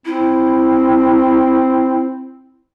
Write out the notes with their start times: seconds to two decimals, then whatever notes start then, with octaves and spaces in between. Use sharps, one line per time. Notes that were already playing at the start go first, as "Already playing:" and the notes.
0.06 C4 E4